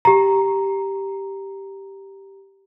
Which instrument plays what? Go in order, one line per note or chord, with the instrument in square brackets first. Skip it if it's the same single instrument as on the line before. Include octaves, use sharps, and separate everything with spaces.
[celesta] G4 A#5